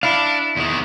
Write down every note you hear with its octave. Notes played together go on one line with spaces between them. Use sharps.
D4 E4 F5
E2 D#3